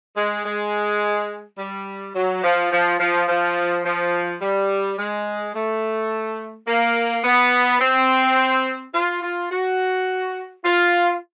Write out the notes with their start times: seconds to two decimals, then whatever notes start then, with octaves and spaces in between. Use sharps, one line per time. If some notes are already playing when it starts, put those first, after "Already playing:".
0.17 G#3
0.45 G#3
1.58 G3
2.16 F#3
2.43 F3
2.72 F3
3.00 F3
3.28 F3
3.85 F3
4.42 G3
4.98 G#3
5.55 A3
6.67 A#3
7.25 B3
7.81 C4
8.94 F4
9.22 F4
9.51 F#4
10.64 F4